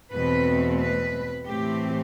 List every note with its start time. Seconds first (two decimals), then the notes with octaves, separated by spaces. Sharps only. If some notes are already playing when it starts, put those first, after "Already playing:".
0.12 E2 B2 A3 C4 B4
0.79 B4
1.46 A2 E3 A3 C4 G4